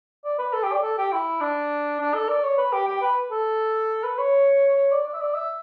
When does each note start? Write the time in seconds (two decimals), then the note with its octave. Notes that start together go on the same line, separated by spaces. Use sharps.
0.24 D5
0.39 B4
0.53 A4
0.63 G4
0.73 D5
0.82 A4
0.98 G4
1.12 E4
1.41 D4
2.00 D4
2.14 A4
2.29 D5
2.44 C#5
2.58 B4
2.73 G4
2.87 G4
3.02 B4
3.31 A4
4.04 B4
4.19 C#5
4.92 D5
5.06 D5
5.14 E5
5.21 D5
5.35 E5